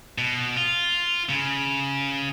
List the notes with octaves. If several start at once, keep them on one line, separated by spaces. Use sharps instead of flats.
B2
F4
C#3